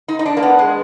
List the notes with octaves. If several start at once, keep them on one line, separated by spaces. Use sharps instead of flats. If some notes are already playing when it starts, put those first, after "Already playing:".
D#4
D#4
D4
A#3
B3
G#3